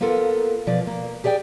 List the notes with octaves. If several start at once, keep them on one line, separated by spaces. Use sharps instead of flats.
A#3 B3 F4 A4 A#4
B2 F3 D5
A#3
G4 G#4 D5 F#5 G5